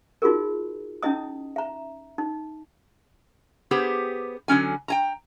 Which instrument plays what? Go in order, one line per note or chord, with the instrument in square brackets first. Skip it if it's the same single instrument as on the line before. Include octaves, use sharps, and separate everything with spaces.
[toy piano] D#4 F4 F#4 G#4 A#4
C#4 D#4 E4 D#5 D#6
E5 A#5
D#4
[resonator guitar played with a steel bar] B3 G4 G#4 C5
D3 F#3 C#4 G#5
G5 G#5 A#5